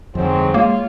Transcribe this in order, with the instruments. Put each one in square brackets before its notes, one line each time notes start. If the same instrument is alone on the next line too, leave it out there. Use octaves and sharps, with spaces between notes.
[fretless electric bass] G1 F2 [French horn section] G#2 F#3 C4
[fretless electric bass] G#3 [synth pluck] A#3 [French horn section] F4 C#5